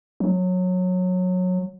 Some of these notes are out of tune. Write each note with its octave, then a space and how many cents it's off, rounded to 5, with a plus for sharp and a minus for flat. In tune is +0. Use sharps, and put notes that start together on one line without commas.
F#3 -20